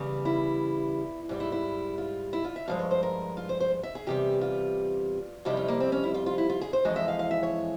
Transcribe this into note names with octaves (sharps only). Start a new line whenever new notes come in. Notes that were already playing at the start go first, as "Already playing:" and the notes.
Already playing: E2 C#3 G3
E4
G#2 G3
E4
E4
F4
E4
F4
E5
G2 F3 G#3 F5
C#5
C5
A#4
F4
C5
C5
E5
G#4
E2 C3 G3 G4
F4
F2 C3 G3 E4
C#4
A#3
C4
C#4
E4
F4
F4
E4
F4
G#4
C5
F2 E3 G#3 C#5
E5
F5
F5
E5
C#5